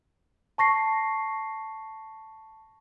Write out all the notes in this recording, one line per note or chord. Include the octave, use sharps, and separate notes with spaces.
A5 C#6 A#6 C7